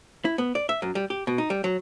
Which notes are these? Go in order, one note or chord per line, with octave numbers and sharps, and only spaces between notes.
E4
B3
D5
E5
F#2
G3
G4
B2
D#4
G3
F#3